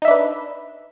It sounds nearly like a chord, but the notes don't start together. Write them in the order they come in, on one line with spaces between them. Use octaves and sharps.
D#4 E5 D4 B4